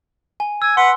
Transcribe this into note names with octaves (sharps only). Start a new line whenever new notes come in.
G#5
G#5 E6
B4 F#5 C6